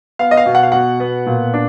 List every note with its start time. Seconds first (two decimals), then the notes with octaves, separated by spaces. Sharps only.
0.19 B3 F5
0.31 D#5
0.37 F5
0.46 B2
0.55 F#5
0.63 F5
0.72 B2 F#5
1.00 B3
1.26 A#2
1.54 D4